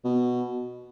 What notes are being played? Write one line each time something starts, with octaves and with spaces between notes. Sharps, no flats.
B2